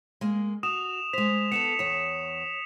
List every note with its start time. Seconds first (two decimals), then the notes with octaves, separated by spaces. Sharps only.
0.21 G#3 A#3
0.63 F#4 D#6 E7 F7
1.13 G#3 C5 B6 F7
1.52 B3 D#4 A4 C#7 E7 F7
1.79 E2 C#5